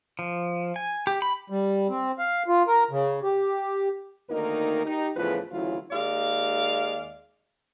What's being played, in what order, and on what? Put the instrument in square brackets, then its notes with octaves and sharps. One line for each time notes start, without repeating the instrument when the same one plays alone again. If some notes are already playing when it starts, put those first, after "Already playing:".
[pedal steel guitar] F3
G#5
G4
B5
[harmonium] G3
C4
F5
F4
A#4
C#3
G4
[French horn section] D2 D#3 A#3 D#4 A#4
D#4 G4
E2 A2 C#3 F3 F4 B4
D2 C#3 E3 F#3 E4 F4
[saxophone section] D#2 G#3 D5 F5